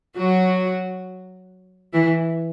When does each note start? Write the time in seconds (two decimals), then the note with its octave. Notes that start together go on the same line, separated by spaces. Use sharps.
0.17 F#3 F#4
1.93 E3 E4